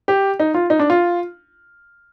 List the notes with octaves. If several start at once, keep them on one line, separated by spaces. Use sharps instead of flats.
G4
D#4
F4
D#4
D4
F4